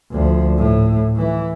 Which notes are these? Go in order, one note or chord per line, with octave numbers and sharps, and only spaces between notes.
D2 F3
A2
E3